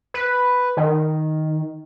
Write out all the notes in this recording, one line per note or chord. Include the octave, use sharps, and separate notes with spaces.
B4
D#3